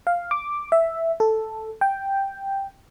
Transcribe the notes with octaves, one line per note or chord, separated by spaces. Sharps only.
F5
D6
E5
A4
G5